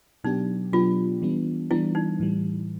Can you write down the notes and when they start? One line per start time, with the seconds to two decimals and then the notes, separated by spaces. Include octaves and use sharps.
0.24 B2 F#3 B3 D4 D#4 G4
0.73 B2 F#3 B3 D4 F4 G4
1.22 E3 G3 B3 D4
1.71 E3 G3 B3 D4 E4
1.95 D#4
2.20 A2 E3 G3